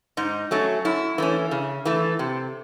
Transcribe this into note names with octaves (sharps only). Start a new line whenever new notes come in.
G#2 D#4
F#3 A3 C#4
F#2 E4
E3 A3 C#4
C#3
E3 A3
C3